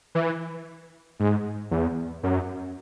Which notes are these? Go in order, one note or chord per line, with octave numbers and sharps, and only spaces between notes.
E3
G#2
E2
F#2